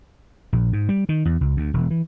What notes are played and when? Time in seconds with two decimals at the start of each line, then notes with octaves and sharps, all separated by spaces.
0.53 A#1
0.73 G#2
0.89 G3
1.09 D#3
1.25 E2
1.41 C#2
1.57 D2
1.74 E1
1.91 E3